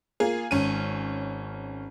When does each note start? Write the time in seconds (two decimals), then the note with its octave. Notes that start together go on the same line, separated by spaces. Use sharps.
0.20 A#3 F4 G#4
0.51 G#1 C#4 D#7